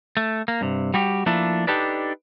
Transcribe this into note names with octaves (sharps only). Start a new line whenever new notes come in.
A3
A#3
G2 C3
G3 F#4 G4
F3 A3 A#3 D4 E4
D4 D#4 G4 A4 B4 D5